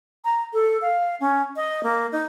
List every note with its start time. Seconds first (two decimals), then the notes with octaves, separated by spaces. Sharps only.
0.25 A#5
0.53 A4
0.82 F5
1.20 C#4
1.56 D#5
1.83 A#3
2.12 D#4